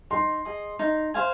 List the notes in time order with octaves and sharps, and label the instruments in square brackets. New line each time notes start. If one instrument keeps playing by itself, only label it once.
[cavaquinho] D#4 [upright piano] C6
[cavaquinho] G#4 D#5
D#4
C5 F5 G#5